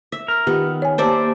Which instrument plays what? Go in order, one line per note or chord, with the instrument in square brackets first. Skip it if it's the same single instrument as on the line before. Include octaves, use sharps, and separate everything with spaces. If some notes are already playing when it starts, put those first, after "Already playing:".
[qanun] E5
[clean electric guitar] A#4
[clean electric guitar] D#3 [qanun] B3 [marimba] F4 G4
[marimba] C#5 G#5
[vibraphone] A#3 G4 A5 [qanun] C5 D5 E5